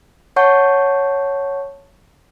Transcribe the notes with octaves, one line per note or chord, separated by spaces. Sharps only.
C#5 F#5 A5 C#6 G6